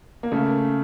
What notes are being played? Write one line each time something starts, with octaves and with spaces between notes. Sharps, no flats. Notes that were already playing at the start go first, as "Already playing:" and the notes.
A#3
C#3 A3